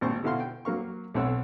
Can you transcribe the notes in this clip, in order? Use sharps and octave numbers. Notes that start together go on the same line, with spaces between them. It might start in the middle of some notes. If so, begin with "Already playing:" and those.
G#1 A#2 C5 C#6
B2 D3 E4 F#4 F5 C6
G5
F#3 A#3 F5 C#6
B1 A3 C4 C#5 F#5 E6